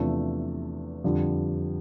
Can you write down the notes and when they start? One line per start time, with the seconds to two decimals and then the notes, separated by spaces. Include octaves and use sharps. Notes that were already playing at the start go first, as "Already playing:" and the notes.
Already playing: E2 C3 F3 A3 D4
1.04 F2 D3 G3 D4 F4